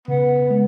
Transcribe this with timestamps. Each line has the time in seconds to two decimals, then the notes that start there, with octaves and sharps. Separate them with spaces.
0.08 C#3 B3
0.50 G#3